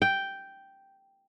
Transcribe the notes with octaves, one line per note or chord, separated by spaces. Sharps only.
G5